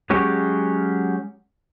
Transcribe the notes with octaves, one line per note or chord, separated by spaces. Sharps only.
F#3 G#3 C#4 G4 G#4 C#5